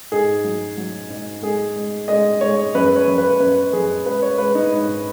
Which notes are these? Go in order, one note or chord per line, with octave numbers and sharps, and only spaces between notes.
G#2 G#4
F#3
F#3
G#2
G#3 G#4
G#3
G#3 D#5
G#3 C#5
F#2 B4
C#5
F#2
B4
F#2 B4
F#2 G#4
G#3 B4
C#5
G#3 B4
D#4
G#2